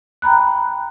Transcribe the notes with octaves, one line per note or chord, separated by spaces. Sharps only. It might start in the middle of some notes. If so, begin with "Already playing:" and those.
G5 A#5 B5 F#6